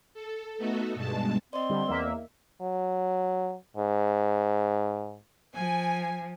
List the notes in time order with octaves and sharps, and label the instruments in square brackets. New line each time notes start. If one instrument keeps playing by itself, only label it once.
[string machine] A4
A3 B3 D#4 F#4 A4
G2 B2 G#3 A5
[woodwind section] C4 [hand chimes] D5 D#5 [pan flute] C6
[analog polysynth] D3 G3
E2 A#3 E5
[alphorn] F#3
G#2
[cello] F3 [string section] G#5